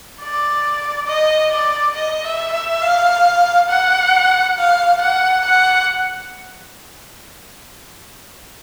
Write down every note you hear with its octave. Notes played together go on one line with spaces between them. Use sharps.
D5
D#5
D5
D#5
E5
E5
F5
F#5
F5
F#5
F#5